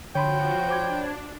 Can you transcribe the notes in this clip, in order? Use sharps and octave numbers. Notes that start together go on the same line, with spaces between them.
D3 F3 F#4 C#5 G5 B5 C6
D4 C5 D6 G#6